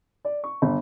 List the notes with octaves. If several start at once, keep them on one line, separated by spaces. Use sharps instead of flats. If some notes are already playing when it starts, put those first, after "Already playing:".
D5
C#6
G1